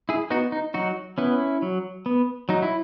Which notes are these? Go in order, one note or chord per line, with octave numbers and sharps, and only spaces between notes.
E4 G#4
B3 D#4 F#4
D#4
F#3 D#4 F#4
B3 C#4 E4
F#3
B3
F#3 D#4
E4